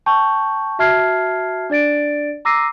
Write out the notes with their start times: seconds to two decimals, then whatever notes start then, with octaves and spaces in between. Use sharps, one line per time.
0.06 G5 A5 C#6 G6
0.79 F#4 E5 A5 F6 G#6 C7
1.70 D4 D5 A6 D7
2.45 A#5 D6 E6 A#6 C7 D#7